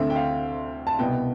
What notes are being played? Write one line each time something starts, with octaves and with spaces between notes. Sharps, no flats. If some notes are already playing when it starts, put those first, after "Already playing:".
Already playing: D2 D3 A3 C4 E5
G5
F5
A5
C2 B2 B3 G5